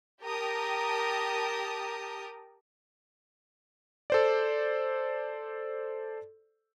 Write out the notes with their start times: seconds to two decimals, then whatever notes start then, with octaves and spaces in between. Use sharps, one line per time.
0.22 G4 A#4 G5 A5 A#5 D#6
4.10 A4 C5 D5